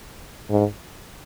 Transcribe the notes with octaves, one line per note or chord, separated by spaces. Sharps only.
G#2